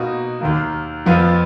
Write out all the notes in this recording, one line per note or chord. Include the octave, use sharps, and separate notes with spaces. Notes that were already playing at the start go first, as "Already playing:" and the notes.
Already playing: B2 A#3 D#4 F#4
D#2 D#3 A#3
F2 F3 B3 F4